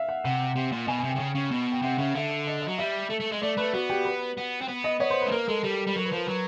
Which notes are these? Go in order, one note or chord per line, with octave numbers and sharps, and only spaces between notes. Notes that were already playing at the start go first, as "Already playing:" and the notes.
Already playing: E5 F5
F#5
C3 F#5
C3
A#2
B2 G#5
G#5
C3
G5
C3
C#3
C#3
B2
G5
C3 F#5
C#3 E5
D3 E5
D#5
D#5
F#3
G3 E5
A3
A3
G#3
A3 D5
A3 B4
B3 F#4
G4
B4
B3
C4
B3
D#5
B3 C#5
C5
B4
A3
A#3 A#4
G#3 A4
G3
G3
F#3 A#4
B4
F3 A#4
F#3 B4